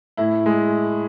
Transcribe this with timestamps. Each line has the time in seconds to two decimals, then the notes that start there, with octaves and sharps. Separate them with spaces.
0.17 A2 E4
0.46 G#3